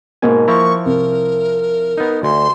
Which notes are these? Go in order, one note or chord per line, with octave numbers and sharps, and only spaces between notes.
G#2 B2 A#3 G#5
F3 E4 A#5 C#6
C2 A#4
B3 D#4
D2 C6